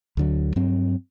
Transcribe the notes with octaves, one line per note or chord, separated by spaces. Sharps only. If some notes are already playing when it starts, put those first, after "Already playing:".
D2 D3 F#3
G2 F#3 C4